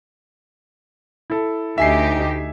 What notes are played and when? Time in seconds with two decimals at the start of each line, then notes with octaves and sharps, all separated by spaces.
1.30 E4 A4
1.78 D2 D#4 G4 E5 G#5 C7